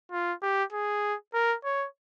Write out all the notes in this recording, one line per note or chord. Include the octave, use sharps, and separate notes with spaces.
F4
G4
G#4
A#4
C#5